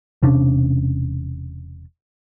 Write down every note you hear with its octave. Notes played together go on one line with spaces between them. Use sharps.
E1 C3 C#4 D4